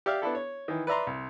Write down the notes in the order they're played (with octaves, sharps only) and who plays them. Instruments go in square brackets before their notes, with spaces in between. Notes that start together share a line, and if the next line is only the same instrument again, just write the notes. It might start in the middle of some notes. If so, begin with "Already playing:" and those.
[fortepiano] G4 D5 E5 F5
B3 D4 E4 A4
C#5
D#3 E3
B4 D5 E5 A#5 C6
C2